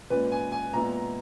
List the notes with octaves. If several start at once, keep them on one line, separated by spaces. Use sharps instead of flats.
A#2 G#3 C#4 B4
G#5
G#5
A#2 G#3 B3 E4 A#5